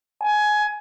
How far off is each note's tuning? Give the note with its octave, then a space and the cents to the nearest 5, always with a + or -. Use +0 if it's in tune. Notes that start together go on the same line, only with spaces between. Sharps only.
G#5 +20